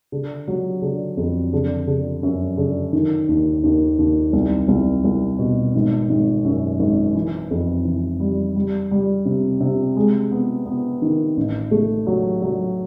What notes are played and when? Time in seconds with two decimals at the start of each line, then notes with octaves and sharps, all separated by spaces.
0.12 D3
0.48 F#3
0.82 D3
1.17 F2
1.53 D3
1.87 D3
2.23 F#2
2.57 D3
2.93 D#3
3.29 D#2
3.64 D#2
3.99 D#2
4.33 C2
4.68 C2
5.04 C2
5.39 B2
5.74 G#1
6.09 G#1
6.45 F#2
6.79 G#1
7.15 E3
7.51 F2
7.85 E3
8.20 G3
8.56 G3
8.91 G3
9.25 C3
9.60 C3
9.96 G#3
10.31 B3
10.66 B3
11.02 D#3
11.37 A1
11.71 A3
12.07 F#3
12.42 F#3